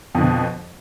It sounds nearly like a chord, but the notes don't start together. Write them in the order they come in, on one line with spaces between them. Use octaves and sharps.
F2 D3 B2